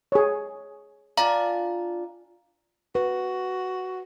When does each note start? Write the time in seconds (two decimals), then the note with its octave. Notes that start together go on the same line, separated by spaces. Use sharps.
0.12 G#4 C#5
1.17 D4 F4 F5 G#5 A#5
2.95 F#4 B4